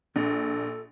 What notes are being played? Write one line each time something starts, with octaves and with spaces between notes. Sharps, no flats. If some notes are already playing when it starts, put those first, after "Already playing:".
A#1 D4 A4